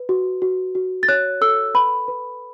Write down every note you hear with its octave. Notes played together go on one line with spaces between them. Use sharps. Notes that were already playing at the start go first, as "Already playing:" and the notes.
Already playing: B4
F#4
F#4
F#4
A6
C#5 F#6
A4 E6
B4 B5
B4